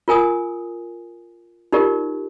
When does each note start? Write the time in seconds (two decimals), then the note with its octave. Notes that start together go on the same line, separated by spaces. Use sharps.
0.08 F4 A#4 G#5 D#6
1.72 D#4 F4 G4 A#4 D5